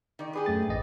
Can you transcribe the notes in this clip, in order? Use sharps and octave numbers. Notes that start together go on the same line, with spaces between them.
D#3 D5
G4 G#4 B4
F#2 A3 A6
A1 D#5